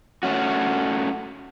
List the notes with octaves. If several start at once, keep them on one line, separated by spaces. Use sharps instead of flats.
A3 C#4 F#4